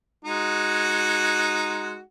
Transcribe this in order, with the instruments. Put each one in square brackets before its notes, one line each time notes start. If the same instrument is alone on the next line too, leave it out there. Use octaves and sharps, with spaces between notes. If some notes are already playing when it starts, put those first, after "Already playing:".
[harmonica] G#3 D#4 F#4